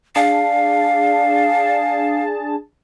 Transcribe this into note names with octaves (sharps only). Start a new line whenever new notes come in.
D4 G#4 F5 A5